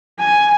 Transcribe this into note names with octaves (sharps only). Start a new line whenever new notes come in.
G#5